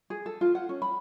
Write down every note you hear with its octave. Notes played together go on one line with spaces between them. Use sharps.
G#4
A4
F4
F#5
C#4
B5